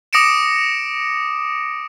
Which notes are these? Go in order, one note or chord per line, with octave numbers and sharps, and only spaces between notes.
D6 D#6 A#6 C#7 D7 E7